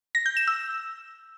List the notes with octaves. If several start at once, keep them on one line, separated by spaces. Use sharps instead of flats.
A#6
G6
E7
E6